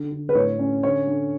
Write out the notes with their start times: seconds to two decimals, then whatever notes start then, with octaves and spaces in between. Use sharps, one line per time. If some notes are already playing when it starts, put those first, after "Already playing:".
Already playing: D3
0.12 D3
0.29 B4
0.35 A2 C#5
0.59 C#4
0.83 D3 C#5
1.07 D3